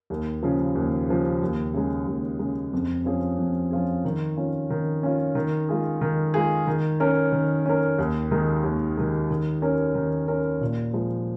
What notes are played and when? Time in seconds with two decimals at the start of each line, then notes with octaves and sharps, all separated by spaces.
0.10 D#2
0.42 C#3 F3
0.75 D#2
1.09 C#3 F3
1.42 D#2
1.74 C#3 G#3
2.07 D#2
2.39 C#3 G#3
2.73 F2
3.05 F3 C#4 F4 G#4
3.38 F2
3.71 F3 C#4 F4 G#4
4.05 D#3
4.37 C#4 F4
4.70 D#3
5.03 C#4 F4
5.35 D#3
5.69 G#3 F4 G#4
6.01 D#3
6.34 G#3 F4 G#4
6.67 D#3
7.00 C#4 A#4
7.32 D#3
7.66 C#4 A#4
7.98 D#2
8.31 D#3 G#3
8.63 D#2
8.97 D#3 G#3
9.30 D#3
9.62 C#4 A#4
9.95 D#3
10.28 C#4 A#4
10.61 A#2
10.93 F3 G#3